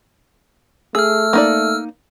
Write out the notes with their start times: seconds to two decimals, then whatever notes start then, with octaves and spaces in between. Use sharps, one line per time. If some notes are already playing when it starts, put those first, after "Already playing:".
0.95 A3 G#4 E6 F6
1.33 A#3 D#4 D5